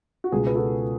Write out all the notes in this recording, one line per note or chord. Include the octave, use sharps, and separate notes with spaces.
F#4
C#2 B2 G#4
B4
F#4 A4